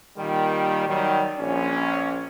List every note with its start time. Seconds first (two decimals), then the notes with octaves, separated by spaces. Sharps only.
0.17 A#2 D#3 G3
0.87 D#3 F#3 G3
1.38 A#1 C#4